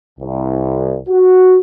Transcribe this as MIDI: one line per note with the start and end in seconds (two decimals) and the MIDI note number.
0.19 0.98 36
1.08 1.57 66